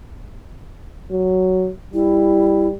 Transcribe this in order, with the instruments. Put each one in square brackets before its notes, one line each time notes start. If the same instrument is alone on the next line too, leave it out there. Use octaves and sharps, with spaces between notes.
[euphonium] F#3
[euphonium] G3 [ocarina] E4